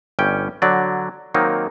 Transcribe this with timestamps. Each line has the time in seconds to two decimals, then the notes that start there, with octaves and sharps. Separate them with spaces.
0.19 G1 G3 C#4 G5
0.62 D3 F#3 D5
1.34 D#3 F#3 A#3 C4 D#4